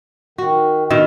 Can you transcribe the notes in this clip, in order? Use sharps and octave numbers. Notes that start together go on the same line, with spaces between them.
D#3 F#4
B2 D#3 E5